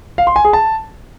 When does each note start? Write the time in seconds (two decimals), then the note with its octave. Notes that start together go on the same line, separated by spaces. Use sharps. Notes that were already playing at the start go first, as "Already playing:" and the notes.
0.18 F5
0.27 C6
0.36 G#5
0.45 G#4
0.53 A5